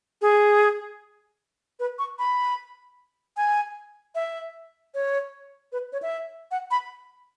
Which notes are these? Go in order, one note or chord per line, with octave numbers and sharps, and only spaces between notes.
G#4
B4
C#6
B5
G#5
E5
C#5
B4
C#5
E5
F#5
B5